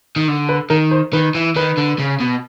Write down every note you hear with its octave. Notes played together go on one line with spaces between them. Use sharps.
D#3
D3
B4
D#3 A#4
C5
D#3 B4
E3
D#3 B4
D3
C#3
B2